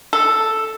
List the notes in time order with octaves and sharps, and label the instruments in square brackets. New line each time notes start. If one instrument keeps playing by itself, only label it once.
[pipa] A4